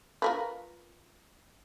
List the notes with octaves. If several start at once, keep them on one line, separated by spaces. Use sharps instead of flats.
F4 A#4 B4